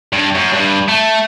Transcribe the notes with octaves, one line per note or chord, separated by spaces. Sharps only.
G2
F#2
G2
A3